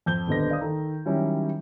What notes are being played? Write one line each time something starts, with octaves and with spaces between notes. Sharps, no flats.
F2 G6 G7
D#1 D3 B3 D#5 A#6
D5 F5 D#6
D#3 A4 A#5
D#3 F#3 G3 C#4 E4